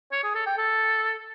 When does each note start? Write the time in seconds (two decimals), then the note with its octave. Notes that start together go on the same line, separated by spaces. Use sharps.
0.12 C#5
0.24 G#4
0.35 A4
0.46 G5
0.58 A4